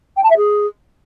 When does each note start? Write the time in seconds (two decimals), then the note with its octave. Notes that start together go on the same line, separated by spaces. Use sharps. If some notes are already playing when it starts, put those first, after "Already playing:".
0.17 G5
0.23 A5
0.30 E5
0.37 G#4